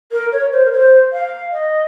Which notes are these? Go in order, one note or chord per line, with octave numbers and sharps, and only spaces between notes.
A#4
C#5
C5
A#4
C5
F5
D#5